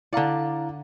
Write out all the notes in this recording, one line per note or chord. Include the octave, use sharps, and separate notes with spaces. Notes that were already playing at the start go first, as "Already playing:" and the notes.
D3 E4 D5 F5 A#5